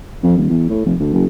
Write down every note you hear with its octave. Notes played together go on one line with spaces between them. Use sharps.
F2
D#1
E2
A2
F1
D2
F#1